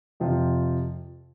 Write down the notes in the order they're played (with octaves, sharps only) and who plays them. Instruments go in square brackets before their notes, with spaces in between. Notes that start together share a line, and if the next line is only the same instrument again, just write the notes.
[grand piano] F2 C3 F3